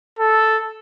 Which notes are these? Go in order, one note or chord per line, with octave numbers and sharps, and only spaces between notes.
A4